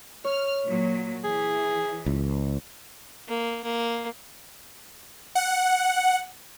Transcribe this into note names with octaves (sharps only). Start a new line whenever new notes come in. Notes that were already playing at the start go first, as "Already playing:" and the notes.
C#5 F6
A#2 F#3
E3 G#4
C#2
A#3
A#3
F#5